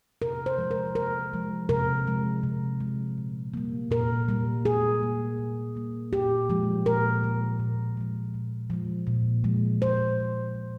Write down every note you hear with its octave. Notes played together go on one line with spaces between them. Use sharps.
C3 A#4
C5
F3 G#3
A#4
C3 A#4
F3 G#3
C3 A#4
F3 G#3
C3
F3 G#3
A#2
G3 A#3
A#2 A#4
G3 A#3
A#2 G#4
G3 A#3
A#2
G3 A#3
A#2 G4
F3 G#3
A#2 A#4
F3 G#3
A#2
F3 G#3
A#2
F3 G#3
A#2
F3 G#3
A#2 C5
F3 G#3
A#2